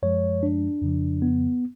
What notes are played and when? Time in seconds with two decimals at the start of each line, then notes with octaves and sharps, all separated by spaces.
0.03 F#2 F3 G#3 C#5
0.43 D4
0.82 F2 C#3 F3
1.22 B3